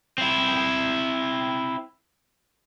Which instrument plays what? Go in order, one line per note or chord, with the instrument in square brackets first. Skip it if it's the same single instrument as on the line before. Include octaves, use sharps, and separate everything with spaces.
[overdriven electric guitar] C4 E4